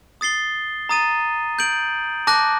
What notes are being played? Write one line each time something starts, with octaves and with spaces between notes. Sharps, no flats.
D#6 A6 C7 G7
A#5 D#6 A6 D#7
G6 D7 F#7
A5 D6 F#6 A#6